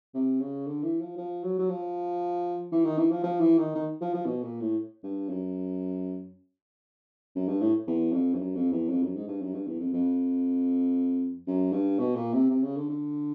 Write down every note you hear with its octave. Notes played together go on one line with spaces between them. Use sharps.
C3
C#3
D3
E3
F3
F3
F#3
F#3
F3
E3
D#3
E3
F3
F3
E3
D#3
D#3
F3
F3
B2
A#2
A2
G2
F#2
F#2
G2
A2
E2
F2
G2
F#2
F2
E2
F2
F#2
G#2
G2
F#2
G2
E2
F2
F2
F#2
G2
B2
A#2
C3
C3
C#3
D3
D3